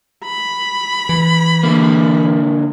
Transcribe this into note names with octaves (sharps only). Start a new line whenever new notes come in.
B5
E3
D3 A#3